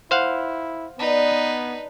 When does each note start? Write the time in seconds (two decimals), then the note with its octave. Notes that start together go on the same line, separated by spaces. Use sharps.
0.11 F3 E4 C5 F5 F#5
0.99 B3 D4 D#4 B4